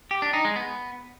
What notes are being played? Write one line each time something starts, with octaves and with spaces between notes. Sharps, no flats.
G4
D4
D#4
G#3
B3